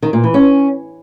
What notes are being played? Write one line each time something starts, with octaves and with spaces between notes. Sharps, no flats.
D#3
A#2
E3
C#4